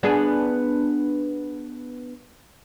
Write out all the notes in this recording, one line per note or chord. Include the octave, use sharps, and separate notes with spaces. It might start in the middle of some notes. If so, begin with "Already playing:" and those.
B3 D4 G#4